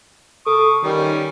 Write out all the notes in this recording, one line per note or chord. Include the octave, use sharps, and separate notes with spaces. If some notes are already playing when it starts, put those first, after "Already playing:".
A4 C#6 D#6
D#3 G3 C#4